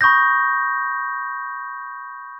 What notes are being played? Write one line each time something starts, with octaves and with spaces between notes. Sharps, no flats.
B5 C#6 D#6 G6 A#6